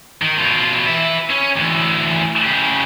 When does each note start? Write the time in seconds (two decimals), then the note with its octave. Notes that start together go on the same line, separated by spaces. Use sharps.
0.22 D#3
0.37 B2 F4
0.87 B4 E5
1.30 C#4
1.56 D2 E3
2.45 C#3 G4